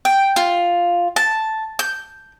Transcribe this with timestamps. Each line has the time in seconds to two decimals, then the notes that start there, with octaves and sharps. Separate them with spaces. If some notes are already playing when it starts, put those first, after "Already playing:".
0.05 G5
0.36 F4
1.16 A5
1.79 G6